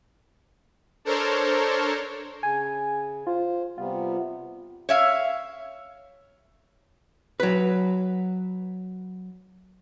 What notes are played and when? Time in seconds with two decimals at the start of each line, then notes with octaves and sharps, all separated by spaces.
1.05 D4 A4 A#4 C5 C#5
2.43 C#3 G#5
3.27 F4 C5
3.78 C3 G3 B3 F4
4.89 C#5 E5 F5
7.40 F#3 B4